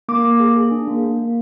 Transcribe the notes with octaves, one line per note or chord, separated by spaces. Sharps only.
A#3 D6
A#3
G#4
G#4
D4
A#3
A#3
A#3